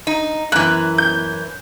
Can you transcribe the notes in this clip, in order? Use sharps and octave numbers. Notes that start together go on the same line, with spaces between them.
D#4
F#2 E3 F#6
G6